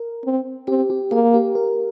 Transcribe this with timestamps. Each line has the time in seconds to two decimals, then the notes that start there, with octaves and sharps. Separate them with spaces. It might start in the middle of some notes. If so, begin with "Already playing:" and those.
Already playing: A#4
0.25 C4
0.68 C4 G4
0.90 G4
1.12 A#3 G#4
1.34 G4
1.55 A#4